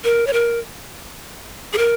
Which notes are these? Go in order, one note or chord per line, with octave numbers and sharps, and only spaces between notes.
A#4
C#5
A#4
G#4
A#4